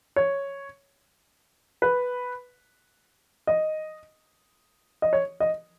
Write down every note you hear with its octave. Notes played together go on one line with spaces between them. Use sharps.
C#5
B4
D#5
D#5
C#5
D#5